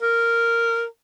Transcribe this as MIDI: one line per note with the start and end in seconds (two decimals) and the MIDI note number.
0.02 0.84 70